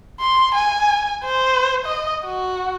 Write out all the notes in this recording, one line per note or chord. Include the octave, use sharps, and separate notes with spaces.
C6
G#5
C5
D#5
F#4